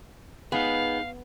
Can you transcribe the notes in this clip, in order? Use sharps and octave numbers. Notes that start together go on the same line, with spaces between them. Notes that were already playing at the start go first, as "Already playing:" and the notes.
B3 D#4 G#4 F5